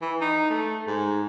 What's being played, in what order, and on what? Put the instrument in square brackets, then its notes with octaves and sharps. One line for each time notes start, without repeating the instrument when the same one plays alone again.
[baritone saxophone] E3
D#4
A3
G#2